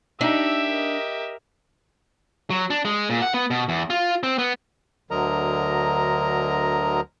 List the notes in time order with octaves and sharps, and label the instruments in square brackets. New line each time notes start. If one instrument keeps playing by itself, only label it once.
[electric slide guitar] D4 [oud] D#4 [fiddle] G4 E5 [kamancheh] E6
[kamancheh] A#4 D#5
[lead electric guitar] F#3
D4
G#3
A#2
F#5
B3
B2
E2
F4
C4
B3
[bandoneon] D2 D3 F#3 A#4 D#5 A#5